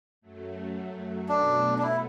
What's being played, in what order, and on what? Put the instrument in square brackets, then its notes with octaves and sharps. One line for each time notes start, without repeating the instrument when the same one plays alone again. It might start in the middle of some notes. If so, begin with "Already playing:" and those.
[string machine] F#2 F#3 A3
[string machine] B2 F#3 A3 [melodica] D4
[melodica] D4
E4